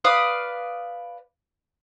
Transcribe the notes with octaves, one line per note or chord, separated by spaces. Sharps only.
B4 D5 F5 D#6